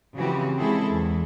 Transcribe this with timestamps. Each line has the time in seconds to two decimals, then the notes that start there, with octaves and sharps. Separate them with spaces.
0.16 C#3 E3 F3 C4 F#4 G4
0.58 C#3 G#3 C4 E4 G#4 A4
0.90 E2